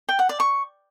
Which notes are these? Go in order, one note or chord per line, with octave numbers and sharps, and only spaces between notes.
G5
F#5
D5
C#6